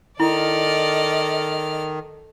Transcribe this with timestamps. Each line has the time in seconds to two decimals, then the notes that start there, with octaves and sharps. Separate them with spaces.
0.20 D#3 E4 A4 D5 D#5 F6